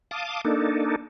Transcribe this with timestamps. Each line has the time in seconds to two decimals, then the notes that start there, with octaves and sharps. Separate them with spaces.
0.11 F5 A5 D6 D#6
0.45 A#3 D4 D#4 A4